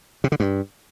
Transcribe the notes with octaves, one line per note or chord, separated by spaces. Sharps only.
C3
D3
G2